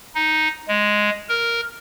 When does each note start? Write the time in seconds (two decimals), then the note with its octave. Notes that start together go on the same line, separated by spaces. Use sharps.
0.15 D#4
0.68 G#3
1.29 A#4